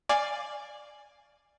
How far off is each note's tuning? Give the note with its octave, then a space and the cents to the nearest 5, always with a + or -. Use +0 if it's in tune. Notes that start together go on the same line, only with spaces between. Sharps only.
D5 +10 F5 +0 G#5 +0